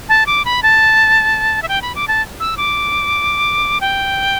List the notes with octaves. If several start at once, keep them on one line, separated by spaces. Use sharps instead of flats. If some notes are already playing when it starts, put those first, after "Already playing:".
A5
D6
B5
A5
E5
G5
B5
D6
A5
E6
D6
G5